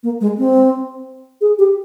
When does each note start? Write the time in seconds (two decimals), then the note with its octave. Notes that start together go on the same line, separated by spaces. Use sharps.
0.03 A#3
0.21 G#3
0.38 C4
1.41 G#4
1.59 G4